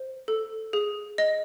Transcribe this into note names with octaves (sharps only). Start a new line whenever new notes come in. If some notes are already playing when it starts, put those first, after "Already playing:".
Already playing: C5
A4
G#4
D#5